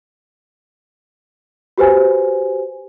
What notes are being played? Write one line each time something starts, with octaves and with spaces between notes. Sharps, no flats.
F#4 G4 B4 C5 G#5